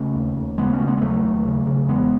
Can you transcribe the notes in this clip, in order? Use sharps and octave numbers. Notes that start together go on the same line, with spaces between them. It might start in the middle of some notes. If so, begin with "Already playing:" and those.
Already playing: C#3 A3 C#4
D#2
D#2
C#3 G#3 B3
A3 C#4
C#3
G#3 B3
B3
D#2 F#3 A3
D#2
C#3
C#3
E2 G#3 B3